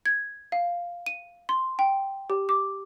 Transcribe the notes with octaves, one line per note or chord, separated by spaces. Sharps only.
G#6
F5
D#7
C6
G5
G4
D6